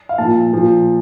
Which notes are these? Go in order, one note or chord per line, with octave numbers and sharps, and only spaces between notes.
F5
A#2 F3 A5
A#2 F3